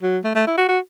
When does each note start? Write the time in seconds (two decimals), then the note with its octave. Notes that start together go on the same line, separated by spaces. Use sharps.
0.03 F#3
0.24 A3
0.35 A3
0.47 E4
0.58 F#4
0.68 F#4